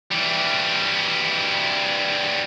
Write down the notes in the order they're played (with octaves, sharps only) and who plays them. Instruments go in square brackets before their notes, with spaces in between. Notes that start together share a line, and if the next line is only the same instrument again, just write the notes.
[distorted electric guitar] E3 G3